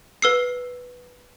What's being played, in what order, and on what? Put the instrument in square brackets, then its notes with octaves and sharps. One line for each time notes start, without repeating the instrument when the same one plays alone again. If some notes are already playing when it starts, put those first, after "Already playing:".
[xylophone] B4 E6 C7